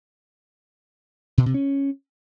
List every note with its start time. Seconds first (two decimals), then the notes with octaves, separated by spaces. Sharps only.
1.38 B2
1.46 C3
1.54 C#4